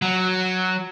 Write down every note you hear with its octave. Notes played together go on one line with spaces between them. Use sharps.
F#3